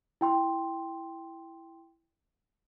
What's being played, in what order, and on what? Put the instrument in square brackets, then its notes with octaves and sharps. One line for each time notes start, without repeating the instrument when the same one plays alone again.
[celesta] E4 G5 C6